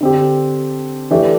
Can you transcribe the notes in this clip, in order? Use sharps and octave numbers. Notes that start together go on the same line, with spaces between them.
D3 C4 G4
E3 A3 D4 G4